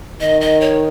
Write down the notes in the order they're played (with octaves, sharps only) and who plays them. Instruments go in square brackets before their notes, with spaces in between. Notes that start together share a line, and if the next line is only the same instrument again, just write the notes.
[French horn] D#3 [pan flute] D#5
[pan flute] D#5
C#5